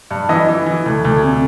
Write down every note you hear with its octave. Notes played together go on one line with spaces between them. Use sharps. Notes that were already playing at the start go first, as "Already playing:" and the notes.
G2
E3 D#5
E3
E3
D2
D2
C3